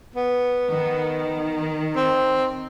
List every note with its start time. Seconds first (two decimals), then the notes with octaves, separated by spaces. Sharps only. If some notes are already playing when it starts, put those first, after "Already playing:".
0.16 B3
0.72 D#3
1.96 C4